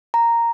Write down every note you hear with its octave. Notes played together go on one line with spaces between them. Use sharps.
A#5